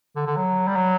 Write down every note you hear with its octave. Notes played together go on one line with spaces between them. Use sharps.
D3
D3
F#3
G3
F#3